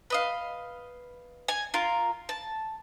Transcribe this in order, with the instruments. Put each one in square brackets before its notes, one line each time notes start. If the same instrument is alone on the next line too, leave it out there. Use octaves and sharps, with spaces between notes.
[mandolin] B4 D#5 F5
G#5
F4 A#4
A5